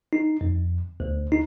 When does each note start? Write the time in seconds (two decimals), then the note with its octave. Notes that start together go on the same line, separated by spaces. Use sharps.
0.13 D#4
0.41 F2
1.00 D2
1.32 D#4